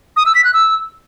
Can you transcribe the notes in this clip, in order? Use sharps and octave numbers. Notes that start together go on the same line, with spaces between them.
D#6
E6
B6
F#6
E6